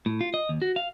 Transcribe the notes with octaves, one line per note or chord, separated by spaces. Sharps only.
A2
F4
D#5
D#2
F#4
F5